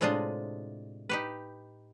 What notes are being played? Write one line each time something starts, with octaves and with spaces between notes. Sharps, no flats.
A2 C3 G#3 D4 F4 D#5
D#4 G4 B4